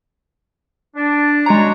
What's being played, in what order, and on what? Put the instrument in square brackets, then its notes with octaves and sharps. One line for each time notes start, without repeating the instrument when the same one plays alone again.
[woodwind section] D4
[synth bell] G#3 A#5 [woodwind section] D4 F#4 C#5